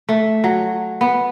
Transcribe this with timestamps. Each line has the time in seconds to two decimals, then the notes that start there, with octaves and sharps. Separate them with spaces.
0.09 A3
0.44 F#3
1.01 B3